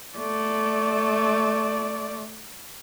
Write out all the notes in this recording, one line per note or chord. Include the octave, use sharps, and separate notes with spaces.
A3 D5